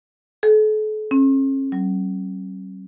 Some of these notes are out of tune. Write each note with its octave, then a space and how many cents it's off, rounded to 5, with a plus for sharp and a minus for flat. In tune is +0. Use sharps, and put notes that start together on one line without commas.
A4 -40
C#4 -45
F#3 +45